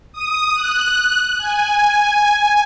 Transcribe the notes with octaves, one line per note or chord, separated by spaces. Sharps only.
D#6
F#6
G#5